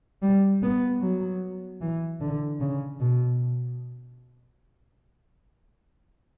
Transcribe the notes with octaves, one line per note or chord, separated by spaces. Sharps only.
G3
B3
F#3
E3
D3
C#3
B2